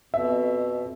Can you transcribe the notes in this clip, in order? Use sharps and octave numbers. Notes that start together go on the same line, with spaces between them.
F2 B2 E5